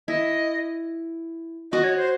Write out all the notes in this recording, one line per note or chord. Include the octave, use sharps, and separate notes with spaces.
E4 D#5
F#4 D#5
C#5
C5